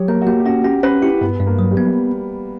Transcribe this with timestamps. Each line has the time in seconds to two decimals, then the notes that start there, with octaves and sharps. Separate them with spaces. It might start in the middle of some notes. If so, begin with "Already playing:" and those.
Already playing: F#3 G4 C#5
0.08 A#3 A#4
0.21 F#4
0.27 A#3 G4
0.40 G4
0.46 C#4 F#4
0.64 C#4 G4
0.83 C#4 B4
1.02 E4 G4
1.21 G2 B3
1.40 G2
1.46 A#3
1.59 F#3
1.71 G3
1.77 B3